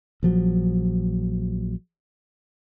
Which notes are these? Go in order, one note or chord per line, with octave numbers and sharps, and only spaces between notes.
A#1 F3 F#3